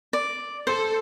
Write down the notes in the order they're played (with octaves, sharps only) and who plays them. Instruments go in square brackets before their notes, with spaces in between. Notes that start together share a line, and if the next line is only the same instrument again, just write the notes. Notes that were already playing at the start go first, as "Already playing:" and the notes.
[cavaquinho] D5
[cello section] A4 [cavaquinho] C5